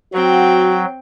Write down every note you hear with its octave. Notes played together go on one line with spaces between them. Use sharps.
F#3 C4 F#4 G5